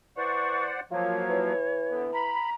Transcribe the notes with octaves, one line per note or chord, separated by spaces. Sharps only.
E3 C5 D5 F#5 C#6
F3 F#3 A#3 F4 C#5
E3
D3 B3
A#5 B5